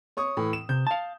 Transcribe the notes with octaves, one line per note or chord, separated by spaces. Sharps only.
C#5 C#6 D#6
A2 E3
E7
C3 G6
F5 A5